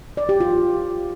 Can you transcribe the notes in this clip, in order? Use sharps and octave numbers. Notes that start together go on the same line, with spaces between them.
D5
G4
F4